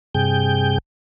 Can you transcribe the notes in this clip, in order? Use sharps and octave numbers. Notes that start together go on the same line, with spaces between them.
G2 C3 G#4 G5 G6